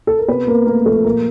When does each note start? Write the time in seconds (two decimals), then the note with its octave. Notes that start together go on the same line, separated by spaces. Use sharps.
0.07 A4
0.18 A#4
0.28 C3 B3 B4
0.47 C3 A#3 A#4
0.66 A3 A#3 A#4
0.86 F3 A3 A4
1.04 A#2 A#3 A#4